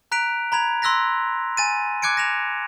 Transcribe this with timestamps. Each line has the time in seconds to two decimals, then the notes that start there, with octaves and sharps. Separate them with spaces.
0.12 A#5 F#6 B6 D7 F7
0.52 A#5 B5 G#6 F7
0.82 B5 C6 E6 F#6 A#6 B6
1.57 G#5 A6 D#7
2.02 D6 F#6 G#6 C#7 D7
2.17 A#6 E7 F7